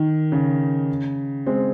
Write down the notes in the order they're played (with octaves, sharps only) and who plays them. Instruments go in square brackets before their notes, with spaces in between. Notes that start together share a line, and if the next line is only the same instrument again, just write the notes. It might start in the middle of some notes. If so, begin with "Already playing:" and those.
Already playing: [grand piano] D#3
C#3
G#3 C4